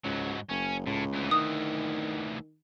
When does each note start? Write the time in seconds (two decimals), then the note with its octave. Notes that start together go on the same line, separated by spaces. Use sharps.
0.04 C#2 G#2 F#3
0.50 F#1 C#4
0.86 C#2 A2
1.13 D2 E3
1.31 D#3 D#6